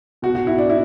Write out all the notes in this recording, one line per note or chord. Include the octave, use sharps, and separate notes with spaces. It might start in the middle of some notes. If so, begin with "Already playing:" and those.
B2 F#4
F#4
E4
D4
E4